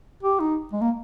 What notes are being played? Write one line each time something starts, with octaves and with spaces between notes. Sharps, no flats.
G4
D#4
G#3
A#3